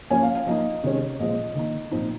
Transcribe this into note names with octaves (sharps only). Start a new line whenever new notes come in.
F3 A#3 C#4 G#5
F5
F5
F3 A#3 D#4 D#5
C3 D#3 G#3 C#4
A#2 F3 G#3 C4 D#5
D#3 A#3 D#4
A#2 F3 C4 D#4